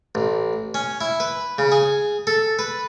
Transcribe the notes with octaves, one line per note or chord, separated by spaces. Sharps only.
A1
C#4
E4
B4
C#3
G#4
A4
B4